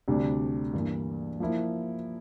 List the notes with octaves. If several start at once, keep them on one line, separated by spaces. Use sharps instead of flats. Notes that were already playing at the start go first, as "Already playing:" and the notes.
D2 C3 G3 D4
G2 E3 A#3
F3 A#3 E4